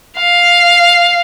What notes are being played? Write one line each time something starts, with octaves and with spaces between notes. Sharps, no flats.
F5